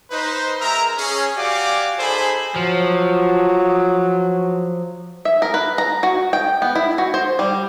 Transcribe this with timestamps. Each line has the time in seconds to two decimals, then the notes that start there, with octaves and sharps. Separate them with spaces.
0.11 D#4 B4 C5
0.61 G#3 A#4 E5 A#5
0.98 C#4 G#4
1.37 F#4 G4 D5 F5 G#5 D6
1.99 D#4 G#4 A4 C5 G#5 B5
2.56 F3 F#3
5.25 E5
5.42 A#4
5.54 B4
5.78 A#5
6.03 F#4
6.33 G5
6.62 B3
6.75 E4
6.98 F#4
7.14 C5
7.39 G3